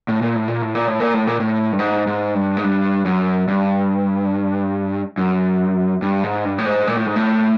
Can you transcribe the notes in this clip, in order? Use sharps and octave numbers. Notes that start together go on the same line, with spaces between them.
A2
A#2
A2
A#2
A2
A#2
A2
A#2
A2
A#2
A2
G2
G#2
G#2
G2
G#2
G2
F#2
G2
F#2
G2
G#2
G2
A2
G#2
A#2
A2
G#2
A2